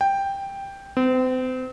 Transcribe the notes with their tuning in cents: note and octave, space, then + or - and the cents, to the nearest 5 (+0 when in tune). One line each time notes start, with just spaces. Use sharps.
G5 +5
C4 -35